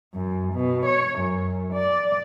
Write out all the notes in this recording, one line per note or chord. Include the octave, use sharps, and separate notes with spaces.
F#2
B2
C#5
F#2
D5